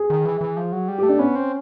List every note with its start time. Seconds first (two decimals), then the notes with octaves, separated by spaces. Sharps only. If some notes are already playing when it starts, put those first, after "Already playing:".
Already playing: G#4
0.10 D#3
0.25 E3
0.41 E3
0.57 F3
0.72 F#3
0.88 G3
0.98 A3 G4
1.09 D4
1.19 B3 C#4
1.35 C4